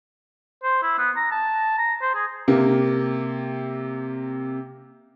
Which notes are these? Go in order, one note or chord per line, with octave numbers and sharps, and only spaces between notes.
C5
E4
B3
A#5
A5
A#5
C5
G#4
C3 A#3 G4